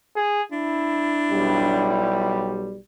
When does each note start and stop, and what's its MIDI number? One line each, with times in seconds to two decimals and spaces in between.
0.16 0.42 68
0.52 2.08 62
0.52 2.58 64
1.32 2.78 35
1.32 2.78 55